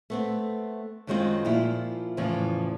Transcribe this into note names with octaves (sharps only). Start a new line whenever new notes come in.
A3 B3 C4
F#2 D#3 F#3 G#3 C4 F4
A#2 F3 E4 F4
E2 A2 C#3 E3 F3